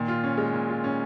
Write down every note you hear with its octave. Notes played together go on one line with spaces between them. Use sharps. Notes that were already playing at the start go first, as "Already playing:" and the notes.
Already playing: A#2 D#3
F4
C#4
G#3
A#2
F4
C#4